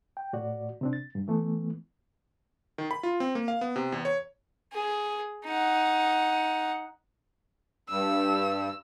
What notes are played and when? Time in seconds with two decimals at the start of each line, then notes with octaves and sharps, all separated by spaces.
0.17 G5
0.33 A2 F#4 D5
0.81 C3 C4 D4
0.93 A6
1.15 G2
1.28 E3 A3 B3
2.78 D#3
2.91 B5
3.03 F4
3.20 C4
3.35 A#3
3.48 F5
3.61 B3
3.76 C3
3.92 E2
4.05 C#5
4.73 G#4
5.45 D#4 F#5
7.89 G2 E6